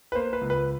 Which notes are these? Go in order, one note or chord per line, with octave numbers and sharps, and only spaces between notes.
B4
A#3 C5
B4
C#2
B4